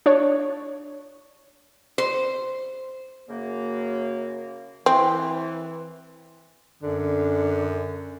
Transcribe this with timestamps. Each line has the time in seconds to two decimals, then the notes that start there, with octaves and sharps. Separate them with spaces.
0.06 D4 C#5
1.98 C5
3.29 F#2 C#3 A#3
4.86 E3 C4
6.83 F#2 D3